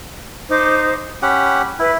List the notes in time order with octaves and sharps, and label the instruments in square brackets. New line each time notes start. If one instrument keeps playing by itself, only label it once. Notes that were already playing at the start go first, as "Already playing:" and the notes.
[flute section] D#4 C5 D6
[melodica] C#4 G4 F#5 [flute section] B5
[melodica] E4 [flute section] B4